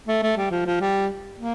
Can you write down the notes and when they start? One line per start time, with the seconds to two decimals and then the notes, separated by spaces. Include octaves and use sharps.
0.08 A3
0.23 A3
0.37 G3
0.51 F3
0.66 F3
0.81 G3
1.39 A#3